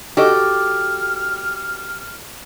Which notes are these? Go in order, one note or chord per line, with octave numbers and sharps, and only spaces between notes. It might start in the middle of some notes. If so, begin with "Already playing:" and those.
F#4 G4 A4 D#5 F6